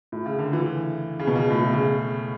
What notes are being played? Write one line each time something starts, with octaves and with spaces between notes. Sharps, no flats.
A2
C#3
D3
E3
C#3
B2
C#3
A2
B2
C#3